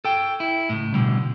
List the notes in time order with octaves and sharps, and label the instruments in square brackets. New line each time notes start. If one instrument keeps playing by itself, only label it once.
[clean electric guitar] A4 G5
E4
C#2 A2
B2 D3 G3